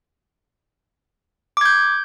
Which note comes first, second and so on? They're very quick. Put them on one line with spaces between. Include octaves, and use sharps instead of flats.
D6 G#6 G6